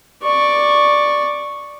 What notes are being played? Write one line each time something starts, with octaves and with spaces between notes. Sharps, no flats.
D5 C#6